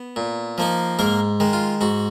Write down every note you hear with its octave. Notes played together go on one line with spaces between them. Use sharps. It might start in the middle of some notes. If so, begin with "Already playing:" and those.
Already playing: B3
A#2
F3 A#3 D#4
G#2 A#3 A#4
D#3 G#3
F4
G#2 F#4